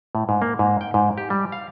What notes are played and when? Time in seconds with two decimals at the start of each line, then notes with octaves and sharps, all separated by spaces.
0.15 A2
0.29 G#2
0.42 A#3
0.59 G#2
0.81 G5
0.94 G#2
1.18 G4
1.30 G3
1.52 F5